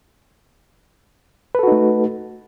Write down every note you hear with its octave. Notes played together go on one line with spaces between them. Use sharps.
A3 D#4 F#4 A4 B4